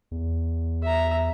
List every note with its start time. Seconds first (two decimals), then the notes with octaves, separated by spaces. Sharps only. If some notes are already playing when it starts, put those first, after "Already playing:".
0.11 E2
0.83 E5 A#5